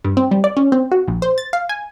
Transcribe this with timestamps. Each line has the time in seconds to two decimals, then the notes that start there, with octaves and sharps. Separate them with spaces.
0.04 G2
0.17 C4
0.31 G3
0.44 D5
0.57 C#4
0.72 C4
0.91 F#4
1.08 A#1
1.22 C5
1.38 A6
1.53 F5
1.69 G#5